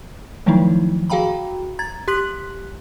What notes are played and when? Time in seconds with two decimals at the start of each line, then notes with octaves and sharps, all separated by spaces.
0.46 D#3 F3 F#3 A3 D#4 E4
1.10 F#4 G#4 F5 G5 A#5 B5
1.79 A#5 G#6 A6
2.08 G4 C6 F#6 B6 F#7